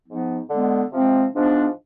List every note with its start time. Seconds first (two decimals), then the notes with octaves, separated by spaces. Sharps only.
0.07 G#2 F3 B3 D#4
0.50 D3 G#3 B3
0.92 C3 F3 G#3 C4
1.35 G#2 F3 B3 D4